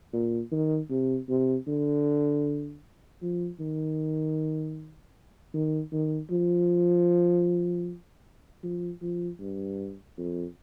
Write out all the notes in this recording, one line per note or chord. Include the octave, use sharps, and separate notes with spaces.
A#2
D#3
C3
C3
D3
F3
D#3
D#3
D#3
F3
F3
F3
G2
F2